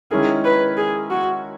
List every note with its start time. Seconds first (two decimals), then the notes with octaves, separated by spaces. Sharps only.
0.11 D#3 G#3 C#4 E4 G#4 A#4
0.45 B4
0.78 G#4
1.10 F#4